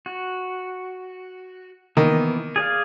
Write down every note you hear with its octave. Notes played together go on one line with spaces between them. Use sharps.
F#4
D#3 E3 A#3 B3
G#4 D5 F5